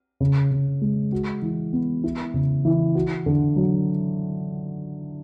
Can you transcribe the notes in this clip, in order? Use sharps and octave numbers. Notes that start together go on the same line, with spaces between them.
C#3
C#3
G#3
F#4
E3
B3
E4
C#3
E3
F#4
D3
F#3